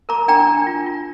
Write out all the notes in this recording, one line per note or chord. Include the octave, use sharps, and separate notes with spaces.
A#4 A#5 D6
D4 G5 A#5
D4
F4
F4